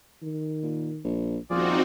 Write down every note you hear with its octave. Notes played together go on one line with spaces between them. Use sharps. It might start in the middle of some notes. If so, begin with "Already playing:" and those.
D#3
A#2
A#1
D#1 F3 C4 D#4 F4 F#4 G#4 D5